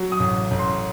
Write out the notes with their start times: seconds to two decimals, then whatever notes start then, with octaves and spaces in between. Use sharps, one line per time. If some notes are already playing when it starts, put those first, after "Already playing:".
Already playing: F#3
0.12 D#6
0.20 A1
0.51 A1
0.59 C6